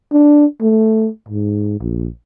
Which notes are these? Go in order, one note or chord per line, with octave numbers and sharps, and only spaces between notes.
D4
A3
G#2
A#1